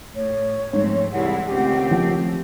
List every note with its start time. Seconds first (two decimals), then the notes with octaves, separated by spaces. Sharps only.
0.16 A2 C#5
0.73 G#2 F3 A3 C4
1.12 C2 E3 G#3 E4 F#5
1.48 C#2 D#3 A3 C4 C#4 G4
1.91 F3